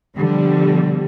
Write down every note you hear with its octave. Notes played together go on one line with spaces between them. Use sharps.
B2 D3 F3 G3